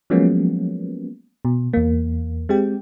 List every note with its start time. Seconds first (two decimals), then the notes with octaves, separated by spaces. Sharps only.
0.10 F3 F#3 G#3 A#3 B3 C#4
1.45 B2
1.73 E2 A#3
2.49 G#3 C4 G4 G5